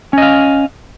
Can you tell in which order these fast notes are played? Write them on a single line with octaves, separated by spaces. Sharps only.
C#4 D#5 F5